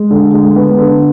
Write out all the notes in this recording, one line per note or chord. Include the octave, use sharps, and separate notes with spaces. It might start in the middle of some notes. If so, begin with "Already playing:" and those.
Already playing: G#3
D3
G#3
B3
D3